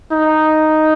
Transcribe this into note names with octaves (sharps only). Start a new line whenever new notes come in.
D#4